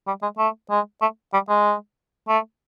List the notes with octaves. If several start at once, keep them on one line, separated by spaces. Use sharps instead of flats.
G3
G#3
A3
G#3
A3
G3
G#3
A3